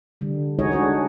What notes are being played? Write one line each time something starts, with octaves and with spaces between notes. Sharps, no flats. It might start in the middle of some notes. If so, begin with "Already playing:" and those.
D3 G3
G#3 D#4 F#4 G#4 C#5 D#5
D4 F#4 G#4 C#5